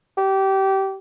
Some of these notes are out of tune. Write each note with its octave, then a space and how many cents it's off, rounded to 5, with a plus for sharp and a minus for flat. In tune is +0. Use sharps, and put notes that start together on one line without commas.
G4 -25